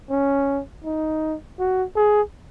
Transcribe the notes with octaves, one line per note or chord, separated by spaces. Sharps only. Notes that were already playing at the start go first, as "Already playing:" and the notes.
C#4
D#4
F#4
G#4